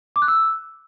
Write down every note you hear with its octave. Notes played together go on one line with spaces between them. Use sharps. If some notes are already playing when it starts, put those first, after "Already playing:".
D6
F#6
E6